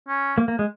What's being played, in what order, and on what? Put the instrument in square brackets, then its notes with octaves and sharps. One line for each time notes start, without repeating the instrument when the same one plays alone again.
[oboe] C#4
[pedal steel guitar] A#3
A#3
G#3